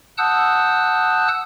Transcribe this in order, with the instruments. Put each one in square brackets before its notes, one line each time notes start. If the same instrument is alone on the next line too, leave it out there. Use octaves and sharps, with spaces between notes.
[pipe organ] F#5 A5 D#6 E6 F#6 G6